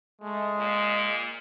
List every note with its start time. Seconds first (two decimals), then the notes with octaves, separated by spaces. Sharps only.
0.21 G#3 A3
0.58 A#2